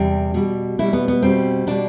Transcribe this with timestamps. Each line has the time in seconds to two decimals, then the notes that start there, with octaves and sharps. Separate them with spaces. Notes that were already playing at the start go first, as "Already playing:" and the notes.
Already playing: E2 C3 G3 G4
0.34 B2 G3
0.79 B2 G3 E4
0.93 B3
1.08 B3
1.22 B2 G3 C4
1.67 B2 G3 D4